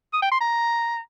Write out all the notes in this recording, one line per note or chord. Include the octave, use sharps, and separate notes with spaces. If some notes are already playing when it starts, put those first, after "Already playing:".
D#6
G5
C6
A#5